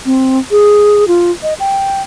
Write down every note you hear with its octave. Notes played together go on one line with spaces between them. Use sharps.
C4
G#4
F4
D#5
G5